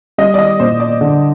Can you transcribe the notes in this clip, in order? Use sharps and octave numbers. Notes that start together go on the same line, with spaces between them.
G3 D#5
D5
D#5
A#2 C5
D5
D3